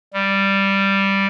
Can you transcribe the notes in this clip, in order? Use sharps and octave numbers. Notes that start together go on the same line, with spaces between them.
G3